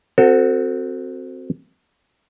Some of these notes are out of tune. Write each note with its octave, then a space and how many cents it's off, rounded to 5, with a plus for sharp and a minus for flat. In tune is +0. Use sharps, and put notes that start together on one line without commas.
C4 -5 F#4 -5 A4 +35